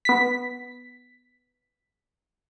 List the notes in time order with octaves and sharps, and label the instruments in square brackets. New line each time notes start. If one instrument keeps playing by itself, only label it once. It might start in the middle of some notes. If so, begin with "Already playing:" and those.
[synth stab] B3 B6